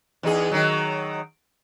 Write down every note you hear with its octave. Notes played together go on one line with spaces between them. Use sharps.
E2 D#4 G#4
D#3 F#3